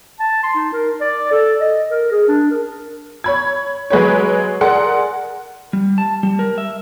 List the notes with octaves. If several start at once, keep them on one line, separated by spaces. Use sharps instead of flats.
A5
C6
D#4
A#4
D5
A4
D#5
A#4
G#4
D4
A#4
C#5 B5 G#6
F#3 G#3 B4 C#5
G#4 A#4 D5 F#5 C6
G3
A5
G3
A#4
E5